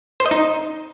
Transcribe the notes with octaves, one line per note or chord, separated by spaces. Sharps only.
C5
D#5
D#4